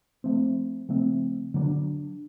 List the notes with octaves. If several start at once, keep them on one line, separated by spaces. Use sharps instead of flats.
F3 A3 C4
C#3 F3 A3 C4
D3 F#3 B3 D4